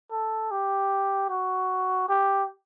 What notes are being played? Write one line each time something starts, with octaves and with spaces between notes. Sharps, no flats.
A4
G4
F#4
G4